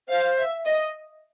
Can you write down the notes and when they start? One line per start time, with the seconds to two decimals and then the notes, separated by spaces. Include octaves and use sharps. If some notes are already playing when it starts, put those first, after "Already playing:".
0.09 C5 F5
0.38 E5
0.66 D#5